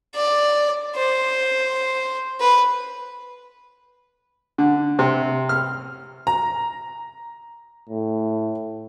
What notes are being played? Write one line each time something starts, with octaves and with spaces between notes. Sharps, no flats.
D5
C5
B4
D3
C3
F6
A#5
A2